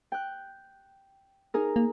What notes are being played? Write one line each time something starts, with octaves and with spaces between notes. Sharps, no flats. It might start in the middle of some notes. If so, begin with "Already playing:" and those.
G5 F#6
D#4 G#4 A#4
A#3